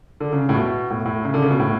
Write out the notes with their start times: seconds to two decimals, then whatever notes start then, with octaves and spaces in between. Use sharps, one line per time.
0.20 D3
0.33 C#3
0.49 A2
0.55 B2
0.90 A2
1.05 A2
1.25 C#3
1.34 D3
1.42 C#3
1.51 B2
1.60 A2